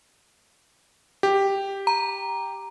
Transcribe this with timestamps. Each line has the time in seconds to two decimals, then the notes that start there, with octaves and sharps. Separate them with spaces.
1.23 G4
1.87 A#5